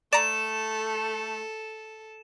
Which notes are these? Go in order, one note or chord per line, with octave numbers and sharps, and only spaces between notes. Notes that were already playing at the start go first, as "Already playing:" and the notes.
A3 A4 D5 A#5 E7